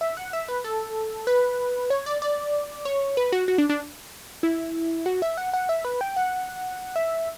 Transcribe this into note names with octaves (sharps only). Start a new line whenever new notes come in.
E5
F#5
E5
B4
A4
B4
C#5
D5
D5
C#5
B4
F#4
F#4
D4
D4
E4
F#4
E5
F#5
F#5
E5
B4
G5
F#5
E5